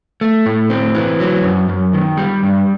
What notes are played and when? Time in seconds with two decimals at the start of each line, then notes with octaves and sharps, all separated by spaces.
0.21 A3
0.46 A2
0.70 C4
0.95 E3
1.20 F#3
1.43 F#2
1.69 F#2
1.93 D#3
2.17 G3
2.43 G2